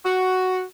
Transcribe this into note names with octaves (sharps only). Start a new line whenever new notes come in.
F#4